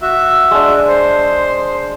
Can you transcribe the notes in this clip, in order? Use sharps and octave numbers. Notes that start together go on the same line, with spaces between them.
F#4 E5
G#3 D4
C5